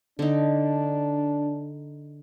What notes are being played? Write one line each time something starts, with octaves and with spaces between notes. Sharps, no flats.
D3 D4 D#4